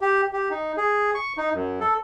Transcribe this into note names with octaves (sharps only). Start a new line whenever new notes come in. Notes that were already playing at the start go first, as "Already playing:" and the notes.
G4
G4
D#4
G#4
C#6
D#4
F#2
A4